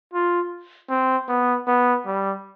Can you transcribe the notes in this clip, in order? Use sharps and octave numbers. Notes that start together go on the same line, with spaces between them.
F4
C4
B3
B3
G3